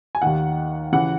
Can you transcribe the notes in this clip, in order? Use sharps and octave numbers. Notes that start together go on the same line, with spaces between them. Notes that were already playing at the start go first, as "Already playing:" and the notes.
G#5
D#2 D#3 F#5
C#3 E3 F#5